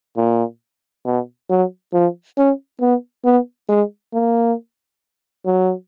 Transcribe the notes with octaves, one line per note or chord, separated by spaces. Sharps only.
A#2
B2
F#3
F3
C#4
B3
B3
G#3
A#3
F#3